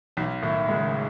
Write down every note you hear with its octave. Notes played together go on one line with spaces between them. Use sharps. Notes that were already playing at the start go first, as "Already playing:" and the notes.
B1 E3
A2 D#3
C#3 G#3